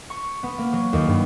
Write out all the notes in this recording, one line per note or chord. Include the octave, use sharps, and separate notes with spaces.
C#6
B3
A#3
F#3
D#2
G2